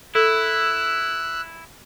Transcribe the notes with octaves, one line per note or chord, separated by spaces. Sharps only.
E4 A4 E6 F#6